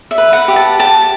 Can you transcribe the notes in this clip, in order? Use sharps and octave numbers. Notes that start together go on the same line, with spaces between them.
E5
B4
F#5
G4
A5
G4 A5